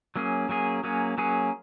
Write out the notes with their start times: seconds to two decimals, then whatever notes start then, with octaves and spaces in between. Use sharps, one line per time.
0.16 F#3 A#3 C#4 G#4
0.49 F#3 A#3 C#4 G#4
0.84 F#3 A#3 C#4 G#4
1.18 F#3 A#3 C#4 G#4